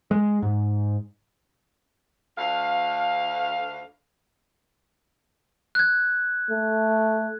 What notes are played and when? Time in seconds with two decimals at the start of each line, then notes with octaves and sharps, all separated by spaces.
0.11 G#3
0.42 G#2
2.38 D2 F5
5.75 F#6 G#6
6.50 A3